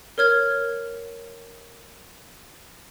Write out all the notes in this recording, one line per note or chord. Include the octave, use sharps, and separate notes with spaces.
A#4 C#5 F6 G#6